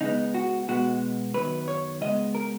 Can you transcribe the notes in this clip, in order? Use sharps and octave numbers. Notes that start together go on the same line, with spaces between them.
C#3 G#3 B3 D#4
F#4
B2 G#3 B3 F#4
F#2 D#3 F#3 B3 B4
C#5
C#3 G#3 B3 D#5
A#4